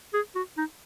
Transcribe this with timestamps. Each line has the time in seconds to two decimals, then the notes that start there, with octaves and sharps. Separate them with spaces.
0.14 G#4
0.36 F#4
0.58 D#4